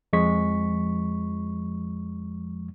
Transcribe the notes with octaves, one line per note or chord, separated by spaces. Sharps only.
F2 F3 G#3 C#6 B6